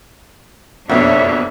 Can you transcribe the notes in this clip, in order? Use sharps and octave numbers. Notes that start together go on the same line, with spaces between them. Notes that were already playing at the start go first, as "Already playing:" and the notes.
F#1 F2 B2 D4 C#5 E5